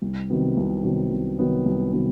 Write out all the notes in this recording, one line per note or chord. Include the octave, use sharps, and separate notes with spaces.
C2
C3 D#3 F#3 B3
C2
C3 D#3 F#3 B3
C2
C3 D#3 F#3 B3
C2
C3 D#3 F#3 B3